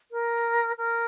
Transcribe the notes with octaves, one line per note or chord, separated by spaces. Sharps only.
A#4
A#4